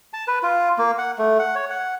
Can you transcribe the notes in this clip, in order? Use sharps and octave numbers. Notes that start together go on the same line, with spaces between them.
A5
B4
F4
A#3
F#5
A3
F#5
C#5
F#5